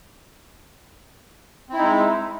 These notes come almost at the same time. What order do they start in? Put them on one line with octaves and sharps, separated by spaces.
C4 E4 D#4 G#3